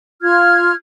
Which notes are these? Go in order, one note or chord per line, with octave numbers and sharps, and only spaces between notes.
F4 F6 G#6